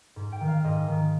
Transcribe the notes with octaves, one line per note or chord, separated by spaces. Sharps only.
G#2
G5
D#3
F5
G#2 D#5
D#3